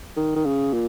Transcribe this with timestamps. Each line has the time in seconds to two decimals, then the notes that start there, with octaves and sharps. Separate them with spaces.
0.16 D#3
0.36 D#3
0.45 C#3
0.73 A#2